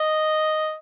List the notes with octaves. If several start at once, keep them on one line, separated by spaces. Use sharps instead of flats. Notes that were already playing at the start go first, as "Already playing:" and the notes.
Already playing: D#5